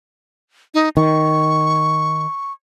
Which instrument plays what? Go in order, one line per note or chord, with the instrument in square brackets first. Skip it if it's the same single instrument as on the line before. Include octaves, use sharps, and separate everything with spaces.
[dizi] D#4
[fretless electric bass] D#3 [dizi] C#6